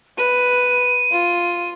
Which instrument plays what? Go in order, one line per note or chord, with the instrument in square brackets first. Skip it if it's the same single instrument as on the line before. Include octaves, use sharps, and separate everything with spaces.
[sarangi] B4 [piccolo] D#7
[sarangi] F4